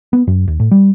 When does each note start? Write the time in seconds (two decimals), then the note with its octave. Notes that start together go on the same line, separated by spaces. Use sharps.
0.13 B3
0.27 F#2
0.48 D#2
0.60 A2
0.71 G3